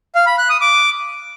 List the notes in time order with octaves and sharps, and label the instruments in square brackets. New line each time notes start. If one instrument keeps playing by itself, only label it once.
[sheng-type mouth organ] F5
B5
F#6
D#6
D6